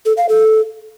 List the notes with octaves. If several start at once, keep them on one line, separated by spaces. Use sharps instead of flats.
A4
F5
A4